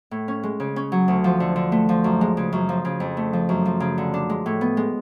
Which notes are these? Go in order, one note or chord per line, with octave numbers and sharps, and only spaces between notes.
A2
C#4
G#3
C#3
C#4
F#3
D2
F3
D3
D3
A3
F3
F#2
G#3
C#3
F#2
F3
C#3
F2
A3
F3
F#2
F3
C#3
D3
D4
G#3
A2
B3
G#3